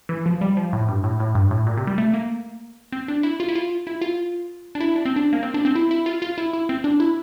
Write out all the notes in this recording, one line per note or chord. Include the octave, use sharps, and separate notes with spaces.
E3
F3
G3
F3
A2
G2
A2
A2
G2
A2
A#2
C3
G3
A3
A#3
C4
D4
E4
F4
E4
F4
E4
F4
D4
E4
D4
C4
D4
A#3
C4
D4
C4
E4
E4
F4
F4
E4
E4
C4
D4
E4